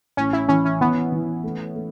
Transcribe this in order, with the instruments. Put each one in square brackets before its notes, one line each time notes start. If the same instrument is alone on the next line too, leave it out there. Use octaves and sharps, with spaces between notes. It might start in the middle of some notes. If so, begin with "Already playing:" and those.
[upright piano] A1 [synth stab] C#4
[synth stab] E4
[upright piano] E3 [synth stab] C#4
[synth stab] C#4
[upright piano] E3 [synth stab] B3
[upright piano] E3
A3
A3